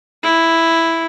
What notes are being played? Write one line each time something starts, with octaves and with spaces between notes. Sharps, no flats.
E4